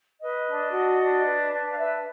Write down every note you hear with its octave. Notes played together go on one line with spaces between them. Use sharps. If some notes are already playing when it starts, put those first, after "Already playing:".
B4 D#5
D4
F#4
D4
B4
D4
F5
B4 E5